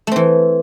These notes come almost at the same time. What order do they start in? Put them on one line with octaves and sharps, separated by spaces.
A3 C4 E3